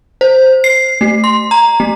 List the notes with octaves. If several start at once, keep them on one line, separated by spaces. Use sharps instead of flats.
C5
C7
A3
C6
A#5
A3